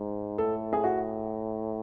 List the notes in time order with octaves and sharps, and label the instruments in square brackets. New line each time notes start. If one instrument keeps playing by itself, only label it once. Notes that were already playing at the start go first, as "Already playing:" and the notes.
Already playing: [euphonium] G#2
[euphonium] A2 [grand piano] A4
[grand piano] G#4
F#4